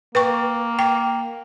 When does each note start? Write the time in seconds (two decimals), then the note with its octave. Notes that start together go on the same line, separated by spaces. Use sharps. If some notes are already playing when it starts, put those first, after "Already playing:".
0.15 A#3 B4 G5 C#6
0.79 G5